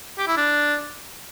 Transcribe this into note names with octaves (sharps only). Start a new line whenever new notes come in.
G4
E4
D4